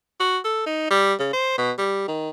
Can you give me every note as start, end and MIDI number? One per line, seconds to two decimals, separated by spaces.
0.20 0.38 66
0.44 0.63 69
0.66 0.90 63
0.90 1.14 55
1.19 1.29 49
1.33 1.56 72
1.58 1.72 47
1.78 2.06 55
2.08 2.30 51